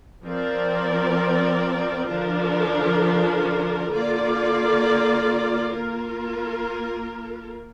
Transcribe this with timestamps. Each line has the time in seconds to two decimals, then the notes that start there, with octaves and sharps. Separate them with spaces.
0.25 F3 C4 A#4 D5
2.07 D3 F3 D4 F4 A#4
3.88 D3 A#3 F4 D5
5.71 A#3 F4 A#4